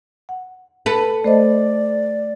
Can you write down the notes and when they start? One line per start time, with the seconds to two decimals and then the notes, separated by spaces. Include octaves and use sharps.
0.29 F#5
0.86 A4 B4
1.24 A3 C5 D5 D#5